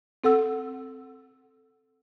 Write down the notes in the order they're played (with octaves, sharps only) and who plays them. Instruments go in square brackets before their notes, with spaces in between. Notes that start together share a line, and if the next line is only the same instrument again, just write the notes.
[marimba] C4 A4 F#5 E6